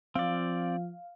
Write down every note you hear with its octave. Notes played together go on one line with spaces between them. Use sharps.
F3 C4 D5 F5